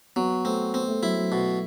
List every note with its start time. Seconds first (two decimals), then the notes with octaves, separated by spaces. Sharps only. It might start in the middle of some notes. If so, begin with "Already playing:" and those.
0.16 F#3 B3
0.45 A3 C4
0.74 B3 C4
0.88 A3
1.03 F#3 E4
1.17 F#3
1.32 B2